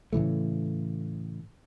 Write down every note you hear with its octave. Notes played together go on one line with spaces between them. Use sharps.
A2 C#3 E3 A3